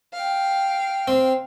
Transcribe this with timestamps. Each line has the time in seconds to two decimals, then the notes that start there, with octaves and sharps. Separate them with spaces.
0.13 F5 G5
1.08 C4